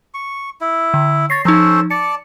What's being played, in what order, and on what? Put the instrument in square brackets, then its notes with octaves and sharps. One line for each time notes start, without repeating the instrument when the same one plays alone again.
[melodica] C#6
E4
[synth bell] D3
[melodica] C#5 [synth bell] A6 A#6 C7
[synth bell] F3 D#4 [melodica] C#4 A4 C5
[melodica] D5 A5 [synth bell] C#7